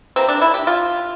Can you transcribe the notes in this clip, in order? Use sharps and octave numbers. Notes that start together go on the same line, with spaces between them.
C3 E3 A#3 C4
D4
E4
G4
F4